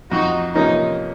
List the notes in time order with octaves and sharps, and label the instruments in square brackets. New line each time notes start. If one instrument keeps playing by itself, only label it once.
[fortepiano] F2 [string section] D#4 F#4
[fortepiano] C3 F3 A#3 C#4 [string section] D#4